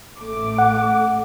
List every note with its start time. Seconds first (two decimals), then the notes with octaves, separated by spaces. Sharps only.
0.20 A1 A3 D6
0.58 F#5